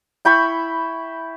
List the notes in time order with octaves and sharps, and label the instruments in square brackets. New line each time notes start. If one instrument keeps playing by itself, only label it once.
[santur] E4 G5 B5 C#6